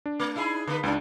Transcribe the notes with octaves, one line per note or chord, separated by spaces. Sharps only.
D4
A3
D#4 E4 G#4
D3 A#3 B4
C#2 G3 D4 D#4